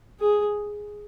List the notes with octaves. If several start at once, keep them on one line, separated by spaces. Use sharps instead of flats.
G#4